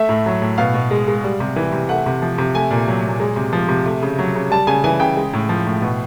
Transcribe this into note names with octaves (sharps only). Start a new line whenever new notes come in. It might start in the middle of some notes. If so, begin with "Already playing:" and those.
Already playing: A3 E5
A2
F#3
A2
B2 F5
B2
G#3
G#3
G3
C3
E3
C3
A3 F#5
C3
F3
C3
A3 G#5
A#2
F#3
A#2
G#3
C3
F3
C3
A3
C#3
F#3
C#3
G3 A5
C#3 G#5
E3 G#5
C#3 G5
G#3
A2
F3
A2
B2